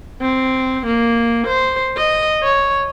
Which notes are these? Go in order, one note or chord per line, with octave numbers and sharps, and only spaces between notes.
C4
A#3
C5
D#5
C#5